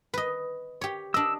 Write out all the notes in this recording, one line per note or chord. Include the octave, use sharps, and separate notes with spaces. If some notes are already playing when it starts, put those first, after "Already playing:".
B4 D#5
G4 C#5
D4 D#5 E6